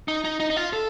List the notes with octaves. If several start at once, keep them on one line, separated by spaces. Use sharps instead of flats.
D#4
D#4
D#4
D#4
F4
A4